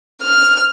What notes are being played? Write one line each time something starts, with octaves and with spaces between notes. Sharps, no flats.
F6